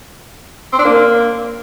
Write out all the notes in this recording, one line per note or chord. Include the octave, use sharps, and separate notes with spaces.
C4
D4
A#3